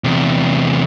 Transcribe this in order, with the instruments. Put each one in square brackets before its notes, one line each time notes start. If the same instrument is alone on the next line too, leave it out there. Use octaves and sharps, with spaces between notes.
[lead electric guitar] E2 C3